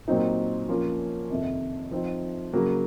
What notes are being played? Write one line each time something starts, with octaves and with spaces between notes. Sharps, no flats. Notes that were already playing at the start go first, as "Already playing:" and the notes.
A#2 F#3 C4 D#4
F3 A#3 C#4 F4
F2 C3 D#3
F3 C4 D#4
C#3 F#3 A#3